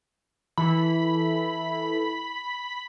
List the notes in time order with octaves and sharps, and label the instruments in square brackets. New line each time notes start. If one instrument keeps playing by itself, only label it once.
[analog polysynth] E3 E4 A4 [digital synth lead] B5